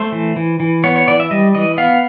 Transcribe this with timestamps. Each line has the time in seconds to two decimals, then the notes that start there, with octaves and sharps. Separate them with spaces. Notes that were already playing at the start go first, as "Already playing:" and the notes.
Already playing: A3 C5
0.12 E3
0.36 E3
0.60 E3
0.84 B3 C#5
0.96 C#5
1.08 E3 D5
1.20 E5
1.31 G3 D#5
1.55 E3 D#5
1.78 B3 F5